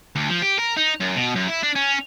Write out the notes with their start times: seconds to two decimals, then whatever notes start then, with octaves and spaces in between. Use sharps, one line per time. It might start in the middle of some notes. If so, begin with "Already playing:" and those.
0.15 D2
0.29 F3
0.42 G4
0.59 A#4
0.77 D#4
1.00 F#2
1.16 B2
1.36 F#2
1.48 E4
1.63 D4
1.76 C#4